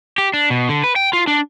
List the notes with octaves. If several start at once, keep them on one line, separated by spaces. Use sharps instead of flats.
G4
D4
B2
D3
B4
G5
F4
D4